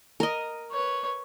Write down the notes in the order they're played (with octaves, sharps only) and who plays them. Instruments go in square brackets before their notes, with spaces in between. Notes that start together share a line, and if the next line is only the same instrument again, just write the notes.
[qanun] A#4 D#5
[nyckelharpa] B4 C#5